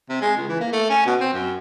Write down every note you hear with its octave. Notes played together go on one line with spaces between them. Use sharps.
C3
G#3
C#2
E3
A#3
A3
C#4
B2
C4
F#2